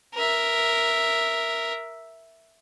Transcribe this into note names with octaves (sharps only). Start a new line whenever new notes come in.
A#4 E5